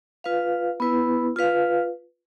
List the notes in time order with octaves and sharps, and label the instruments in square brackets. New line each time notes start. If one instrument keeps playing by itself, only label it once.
[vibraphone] F4 B4 F5
B3 E4 B4
F4 B4 F5